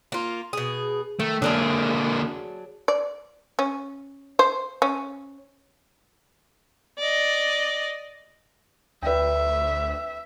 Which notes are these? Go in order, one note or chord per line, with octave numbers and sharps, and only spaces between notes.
A#3 F4
B2 G#4
D#3 A3
D3 F#3 A#3 D4 G#4
D5
C#4
C5
C#4
D5 D#5
D2 B4 D5 E5 G5